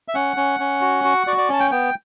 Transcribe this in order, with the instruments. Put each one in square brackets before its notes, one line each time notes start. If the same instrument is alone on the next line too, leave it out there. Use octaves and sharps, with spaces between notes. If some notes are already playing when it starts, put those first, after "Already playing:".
[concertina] E5
C#4 F#5
C#4
C#4
F#4
F#4
F#4 D5
D5
C#4 A5
G5
B3 G5